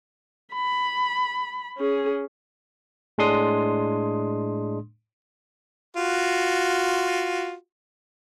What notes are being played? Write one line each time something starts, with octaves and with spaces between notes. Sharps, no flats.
B5
C#4 G#4
A2 G#3 D4 C6 D#6
F4 F#4